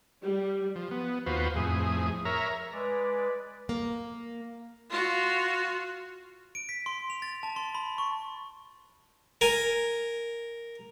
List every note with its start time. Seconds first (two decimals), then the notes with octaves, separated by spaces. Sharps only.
0.23 G3
0.76 F3
0.91 B3
1.26 D#2 F4 F#4 B4 C5
1.56 F2 A2 G#4
2.25 A#4 C#5 E5 A#5
2.72 G#3 B4 D5
3.69 A#3
4.90 F4 F#4
6.55 D7
6.69 B6
6.86 C6
7.10 F7
7.22 A6
7.43 A5
7.56 C6
7.75 B5
7.98 C#6
9.41 A#4 G#5